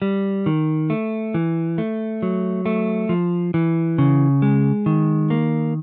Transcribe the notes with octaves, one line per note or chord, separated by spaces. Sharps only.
G3
D#3
A3
E3
A3
F#3
A3
F3
E3
C#3
G#3
D#3
A#3